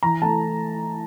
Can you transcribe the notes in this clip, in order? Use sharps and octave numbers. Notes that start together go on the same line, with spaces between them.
E3 A#5
A3 A5